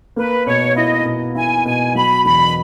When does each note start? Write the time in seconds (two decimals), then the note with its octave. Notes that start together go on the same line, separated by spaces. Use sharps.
0.16 A#3 B4
0.46 B2 C#5
0.76 E4 D#5
1.05 B2
1.35 E4 G#5
1.65 B2 G#5
1.95 F#3 B5
2.25 E1 B5